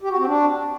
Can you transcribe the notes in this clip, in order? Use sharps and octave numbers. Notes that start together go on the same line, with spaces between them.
G4
F#4
C4
D4